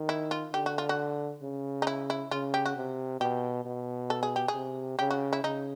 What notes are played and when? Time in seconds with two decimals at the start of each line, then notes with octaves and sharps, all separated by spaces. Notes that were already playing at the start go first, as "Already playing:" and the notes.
Already playing: D#3
0.09 E4
0.31 F4
0.53 D3 G4
0.66 F#4
0.78 F4
0.89 F#4
1.42 C#3
1.82 D#4
1.87 E4
2.10 E4
2.31 C#3 F4
2.54 G4
2.65 F#4
2.76 C3
3.21 B2 G4
3.66 B2
4.10 A4
4.23 G#4
4.36 G4
4.48 G#4
4.55 C3
4.99 C#3 G4
5.10 F#4
5.33 E4
5.44 C#3 D#4